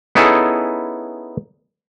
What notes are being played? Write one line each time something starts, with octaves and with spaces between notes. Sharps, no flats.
B3 C#4 D#4 E4 G#4 A4